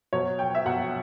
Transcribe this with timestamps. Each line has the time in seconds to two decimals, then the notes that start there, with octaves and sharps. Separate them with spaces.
0.13 B2 F#3 C#5
0.39 G5
0.55 E5
0.65 B2 F#3 F#5